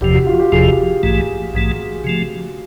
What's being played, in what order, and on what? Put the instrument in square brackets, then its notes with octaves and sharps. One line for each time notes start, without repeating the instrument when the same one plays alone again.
[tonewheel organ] F#1 E2 C3 F3 [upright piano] G4
[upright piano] F#4
F4
G4
[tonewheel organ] F#1 E2 C3 F3 [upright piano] G#4
[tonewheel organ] A#1 G#2 E3 A3
A#1 G#2 E3 A3
C#3 F3 A3